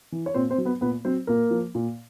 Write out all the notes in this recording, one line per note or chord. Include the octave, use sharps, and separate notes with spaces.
E3
C#5
A#2 C4 C5
C4 C5
F#3
B3 B4
A#2 B3 B4
F#3 C4 C5
A#2 A#3 A#4
F3
A#2